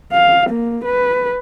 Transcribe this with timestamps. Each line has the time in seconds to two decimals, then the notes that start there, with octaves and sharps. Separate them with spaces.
0.12 F5
0.50 A#3
0.85 B4